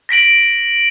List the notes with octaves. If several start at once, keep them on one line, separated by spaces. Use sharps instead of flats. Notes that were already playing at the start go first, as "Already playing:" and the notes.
A#6 B6 D7 F#7